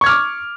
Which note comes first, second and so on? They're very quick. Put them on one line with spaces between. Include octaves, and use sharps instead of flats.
C#6 G#6 F6 D6